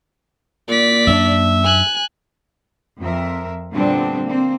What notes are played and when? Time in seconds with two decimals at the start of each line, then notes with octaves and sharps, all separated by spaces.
0.68 A#2 A#3 D5 B6
1.07 F#2 C#4 D4 E5
1.64 G#5 F#6
2.99 F2 C4 A#4 E5
3.72 A#2 D3 G3 B3 C4 D4
4.24 A#3 C4